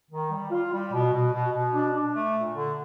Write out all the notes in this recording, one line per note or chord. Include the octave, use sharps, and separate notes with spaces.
D#3
G3
F4
G3
B2
B2
B2
B2
D4
D4
A3
A#2
D3